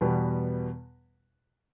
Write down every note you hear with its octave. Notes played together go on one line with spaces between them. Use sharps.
E2 B2 G3 B3